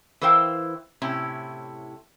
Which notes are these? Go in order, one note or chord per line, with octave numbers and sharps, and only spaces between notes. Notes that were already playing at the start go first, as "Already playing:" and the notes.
E3 E4 A#4 C5 F5 G5
A2 C3 C#4 E4